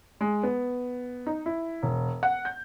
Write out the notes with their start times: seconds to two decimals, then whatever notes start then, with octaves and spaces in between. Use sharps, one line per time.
0.21 G#3
0.43 B3
1.27 D#4
1.46 E4
1.83 E1
2.23 F#5
2.45 G6